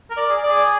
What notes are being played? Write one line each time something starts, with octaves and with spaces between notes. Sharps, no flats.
A#4
D5
G#4
D5
G#4